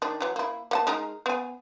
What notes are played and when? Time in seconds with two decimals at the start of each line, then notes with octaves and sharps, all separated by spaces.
0.02 D#3 D4
0.21 E3 F#3
0.36 A#3 E4
0.71 A#3 F#5 A5
0.87 G#3 D#4 A#4
1.26 B3 G#5